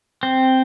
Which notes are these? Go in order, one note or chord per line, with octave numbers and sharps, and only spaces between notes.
C4